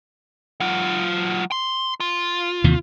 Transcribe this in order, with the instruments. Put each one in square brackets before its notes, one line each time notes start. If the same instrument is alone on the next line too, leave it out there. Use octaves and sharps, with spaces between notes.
[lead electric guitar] F#3 F4
C6
F4
[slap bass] D#2 C3 E3